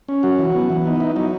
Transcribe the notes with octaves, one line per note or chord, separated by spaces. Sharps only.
C#4
F#3 F#4
E3
B3
E3
B3 D#4
D#4 E4
F#3 D#4